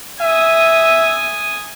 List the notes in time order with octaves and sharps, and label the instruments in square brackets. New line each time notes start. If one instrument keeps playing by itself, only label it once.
[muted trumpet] E5 [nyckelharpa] G#5 D#6